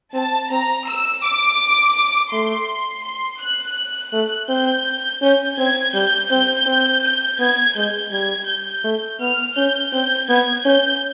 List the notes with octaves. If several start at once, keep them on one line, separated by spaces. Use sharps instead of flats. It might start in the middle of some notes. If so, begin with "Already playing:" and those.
C4 A5
C4 A#5
E6
D6
A3 C6
C6
F#6
A3
C4 G6
C#4 G6
C4 G#6
G3 G6
C4 G6
C4
G6
B3 G#6
G#3 G6
G3 G#6
G6
A3
B3 F6
C#4 G6
C4 G6
B3 G#6
C#4 G6